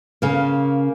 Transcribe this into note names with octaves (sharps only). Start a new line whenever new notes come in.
C#3 A#3